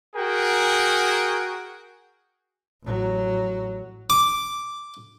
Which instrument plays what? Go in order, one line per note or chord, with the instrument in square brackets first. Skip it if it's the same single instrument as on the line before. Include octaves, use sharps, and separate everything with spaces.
[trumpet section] F#4 G#4 A#4 G5
[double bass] A1 F#3
[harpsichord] D6